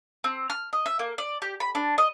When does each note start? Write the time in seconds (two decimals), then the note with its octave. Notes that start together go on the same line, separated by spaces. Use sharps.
0.24 C4
0.50 F6
0.73 D#5
0.86 E5
0.99 A#3
1.18 D5
1.42 G4
1.60 B5
1.75 D4
1.98 D#5